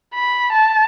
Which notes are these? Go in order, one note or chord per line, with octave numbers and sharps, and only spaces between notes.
B5
A5